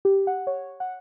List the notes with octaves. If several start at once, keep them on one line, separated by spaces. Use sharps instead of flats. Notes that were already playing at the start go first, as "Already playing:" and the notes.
G4
F#5
C#5
F#5